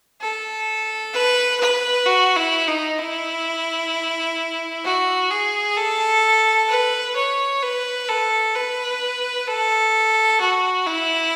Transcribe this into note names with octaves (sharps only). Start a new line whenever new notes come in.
A4
B4
B4
F#4
E4
D#4
E4
F#4
G#4
A4
B4
C#5
B4
A4
B4
A4
F#4
E4